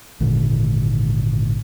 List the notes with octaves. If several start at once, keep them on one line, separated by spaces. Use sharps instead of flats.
G#1 A#2 D3